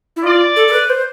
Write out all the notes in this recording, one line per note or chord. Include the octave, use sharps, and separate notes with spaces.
E4
F4 D5
A4
A4
B4
C5